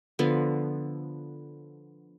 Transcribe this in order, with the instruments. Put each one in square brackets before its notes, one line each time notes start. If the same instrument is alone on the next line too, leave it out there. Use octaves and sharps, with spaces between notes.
[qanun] D3 F3 B3